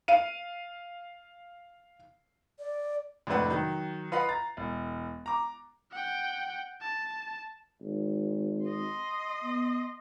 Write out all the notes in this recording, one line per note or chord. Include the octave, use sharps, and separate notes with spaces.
F5 D#7
D5
F2 A2 C3 D4 B4 F#5
D#3 F#3
F4 B4 D#5 F5 F#5 B5
A#5 A6
E1
A#5 D6
F#5 G5
A5
G#1
D#5 C6
B3